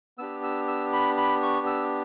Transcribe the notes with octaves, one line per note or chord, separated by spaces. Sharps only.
B3 D4 G4 E6
E6
E6
B5
B5
C#6
E6